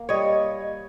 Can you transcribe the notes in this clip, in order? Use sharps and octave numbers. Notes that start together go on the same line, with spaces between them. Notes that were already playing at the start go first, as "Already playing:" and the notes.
Already playing: A#3
G3 C#5 D#5